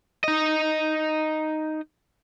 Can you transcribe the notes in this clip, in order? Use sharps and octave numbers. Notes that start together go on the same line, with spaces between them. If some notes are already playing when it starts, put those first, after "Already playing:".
D#4 D#5